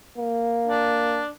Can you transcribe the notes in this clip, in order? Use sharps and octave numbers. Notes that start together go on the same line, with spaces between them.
A#3
D4